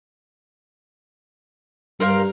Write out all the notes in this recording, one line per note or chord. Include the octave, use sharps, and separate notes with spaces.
G2 A#4 C5 F5